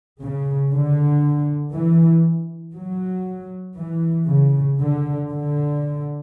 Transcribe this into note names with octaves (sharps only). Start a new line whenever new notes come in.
C#3
D3
E3
F#3
E3
C#3
D3
D3